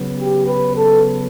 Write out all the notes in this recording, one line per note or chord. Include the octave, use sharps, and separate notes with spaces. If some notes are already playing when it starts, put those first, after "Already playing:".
Already playing: C#3 F#3 B3
G4
B4
A4